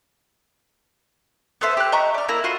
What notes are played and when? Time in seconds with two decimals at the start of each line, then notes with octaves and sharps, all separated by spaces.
1.61 B3 A4 C5 E5
1.77 G4 F#6
1.92 D#5 E5 A#5 C#6
2.14 D5 F6
2.29 A#3 E4 A#5
2.44 F4 F#4 C6